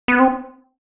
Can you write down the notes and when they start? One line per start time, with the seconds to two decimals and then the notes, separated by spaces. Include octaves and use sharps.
0.08 B3
0.19 C4